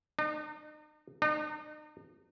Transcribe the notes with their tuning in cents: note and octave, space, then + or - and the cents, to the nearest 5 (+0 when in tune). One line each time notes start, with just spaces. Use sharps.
D#4 -45
D#4 -45